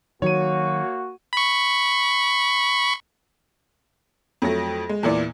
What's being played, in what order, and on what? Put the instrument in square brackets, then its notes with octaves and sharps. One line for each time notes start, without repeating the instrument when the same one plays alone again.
[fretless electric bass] D#3 F#3 [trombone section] A#3 F#4 [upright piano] C#5 D#7
[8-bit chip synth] B5 C#6
[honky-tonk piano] F2 F#3 A3 A#6
G#3
E2 A#2 E3 D5